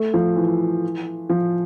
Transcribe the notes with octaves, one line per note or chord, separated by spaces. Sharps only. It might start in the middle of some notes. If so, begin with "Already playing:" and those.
Already playing: A3
F3
E3
F3